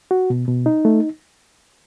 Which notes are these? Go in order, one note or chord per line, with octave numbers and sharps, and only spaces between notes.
F#4
B2
B2
D#4
A3